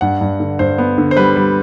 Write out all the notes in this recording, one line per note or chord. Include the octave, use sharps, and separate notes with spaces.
G2 F#5
G2
D3
G2 C5
B3
D3
C5
G3 B4
G3